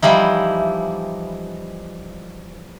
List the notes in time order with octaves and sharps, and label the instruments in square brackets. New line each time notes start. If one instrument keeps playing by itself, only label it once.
[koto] E3 F3 G3 D#4 E4